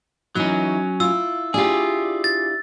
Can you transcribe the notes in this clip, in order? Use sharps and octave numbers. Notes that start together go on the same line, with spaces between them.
E3 F#3 C#4 D#4 E4
E4 F4 E6
D4 E4 F4 G4 G#4
A6